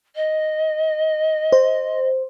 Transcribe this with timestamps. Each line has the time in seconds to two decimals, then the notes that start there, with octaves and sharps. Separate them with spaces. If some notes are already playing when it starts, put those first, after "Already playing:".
0.15 D#5
1.52 C5